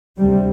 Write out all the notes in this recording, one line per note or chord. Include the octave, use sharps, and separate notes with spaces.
D2 C3 G3